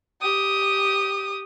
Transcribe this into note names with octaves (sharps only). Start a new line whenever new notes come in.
G4 D#6